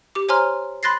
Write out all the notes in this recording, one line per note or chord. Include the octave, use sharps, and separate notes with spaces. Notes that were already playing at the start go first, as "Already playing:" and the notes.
G4 D6
C5 C#5 G#5 A#5 C6 F6
B5 C6 F#6 A6 A#6 C7